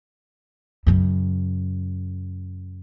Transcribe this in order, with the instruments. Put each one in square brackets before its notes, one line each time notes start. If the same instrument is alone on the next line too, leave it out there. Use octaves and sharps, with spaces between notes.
[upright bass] F#2 C#3